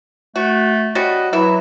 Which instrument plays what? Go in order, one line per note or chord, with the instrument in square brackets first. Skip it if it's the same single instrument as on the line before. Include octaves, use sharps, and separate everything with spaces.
[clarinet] A3 [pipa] F#4
[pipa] G3 C#4 F#4 [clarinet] D#5
[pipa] E3 E4 [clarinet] F#3